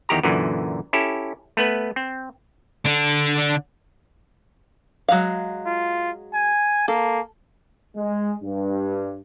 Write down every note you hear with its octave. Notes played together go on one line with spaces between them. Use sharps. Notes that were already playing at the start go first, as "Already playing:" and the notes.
E2 D#3 G4 A#5
F#2 A#2 D3 E3
C#4 E4 G4 A4
A3 B3 B4
C4
D3 D4
F#3 G#3 F5
F4
G#5
A#3 A4
G#3
G2